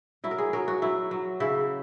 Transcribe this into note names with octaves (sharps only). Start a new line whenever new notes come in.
F#3 E4
A#4
G#4
F#3 A#4
F#4
F#3 E4
F#3
C#3 E4